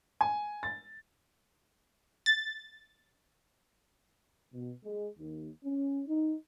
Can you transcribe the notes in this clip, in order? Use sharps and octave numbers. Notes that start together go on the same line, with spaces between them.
G#5
A6
A6
B2
G#3
D#2
C#4
D#4